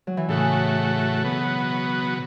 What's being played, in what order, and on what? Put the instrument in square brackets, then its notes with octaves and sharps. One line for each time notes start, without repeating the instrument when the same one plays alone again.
[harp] F#3
E3
[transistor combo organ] A2 A3 F#4 [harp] C#3
[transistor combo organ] B2 F#3 B3